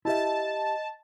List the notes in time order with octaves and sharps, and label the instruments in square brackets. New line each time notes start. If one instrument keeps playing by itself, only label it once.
[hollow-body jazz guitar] E4 G4 E5 [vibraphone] D#5 [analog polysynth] A5